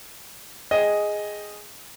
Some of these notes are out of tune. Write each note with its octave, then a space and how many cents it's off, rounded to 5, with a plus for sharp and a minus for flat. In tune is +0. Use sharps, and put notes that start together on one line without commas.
G#4 +0 D#5 +0 G5 +0